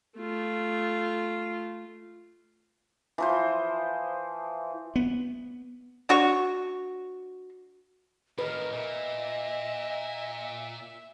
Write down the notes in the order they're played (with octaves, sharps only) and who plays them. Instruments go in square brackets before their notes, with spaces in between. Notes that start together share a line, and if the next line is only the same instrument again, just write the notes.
[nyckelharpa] A3 F4
[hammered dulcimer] E3 F3 C5
[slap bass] B3
[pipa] D4 F#4 C#5 C#6
[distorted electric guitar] A2 D#3 [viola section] A#4 [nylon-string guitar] B4 [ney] D#5
[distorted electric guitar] A#2 [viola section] E5